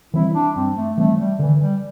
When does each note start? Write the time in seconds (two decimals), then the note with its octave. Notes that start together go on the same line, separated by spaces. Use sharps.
0.13 E3 G3 C4 E4
0.34 D4
0.56 G2 C4
0.76 A3
0.97 E3 G3 A3 C4
1.18 G3
1.39 D3 E3
1.60 G3